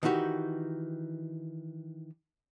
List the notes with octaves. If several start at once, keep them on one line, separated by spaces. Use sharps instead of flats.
D#3 E3 D#4 F#4 G4